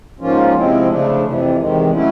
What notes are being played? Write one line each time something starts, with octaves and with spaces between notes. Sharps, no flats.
G#2 F3 A#3 C#4 F4
C3 F3 G#3 C4 E4
C#3 F3 A3 D4
F2 C3 E3
E2 C3 D#3 G#3
F#3 A3 C#4 E4